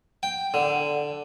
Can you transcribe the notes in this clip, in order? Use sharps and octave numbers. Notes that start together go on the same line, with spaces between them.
G5
D3